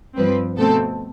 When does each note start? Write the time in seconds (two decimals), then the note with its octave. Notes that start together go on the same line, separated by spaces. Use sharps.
0.16 G2 F3 C4 B4
0.57 B2 A3 C4 A4